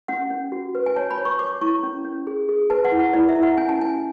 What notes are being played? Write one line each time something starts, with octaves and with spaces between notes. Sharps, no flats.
C#4 F#5
C#4
F#4
B4
G#5
C#5 A5
B5
C#5
C#6
C#5 D6
E4 C#6
C#4
C#4
G#4
G#4
B4 A5
F#5
E4
F#5
E4 D5
E5
E4
F#5
C#4 G#5
A5
C#4 G#5